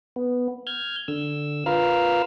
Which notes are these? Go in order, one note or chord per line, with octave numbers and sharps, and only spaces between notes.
B3
F6 G6 G#6
D3 E6
F4 A#4 B4 F5 E6 F6